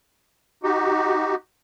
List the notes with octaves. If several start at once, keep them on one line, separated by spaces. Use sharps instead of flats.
D#4 F#4 G4